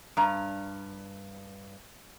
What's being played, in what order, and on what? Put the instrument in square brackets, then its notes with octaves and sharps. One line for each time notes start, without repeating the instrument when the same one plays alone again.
[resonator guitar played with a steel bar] G2 A#5